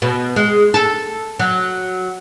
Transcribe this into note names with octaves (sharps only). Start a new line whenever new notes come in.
B2
G#3
A4
F#3